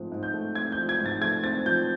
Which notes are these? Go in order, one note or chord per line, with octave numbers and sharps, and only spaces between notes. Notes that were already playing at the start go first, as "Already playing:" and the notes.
Already playing: G#2 F3 A3 C4
G#2
G6
A3
C4 G#6
G6
F3
G#6
G#2
A6
A3 G#6
C4 A6
F3 G6